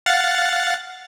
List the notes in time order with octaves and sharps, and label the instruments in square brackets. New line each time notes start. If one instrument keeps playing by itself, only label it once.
[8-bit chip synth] F5 F#5 A6